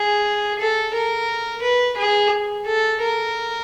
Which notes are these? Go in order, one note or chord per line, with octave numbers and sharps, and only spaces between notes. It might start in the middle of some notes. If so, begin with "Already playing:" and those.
Already playing: G#4
A4
A#4
B4
G#4
A4
A#4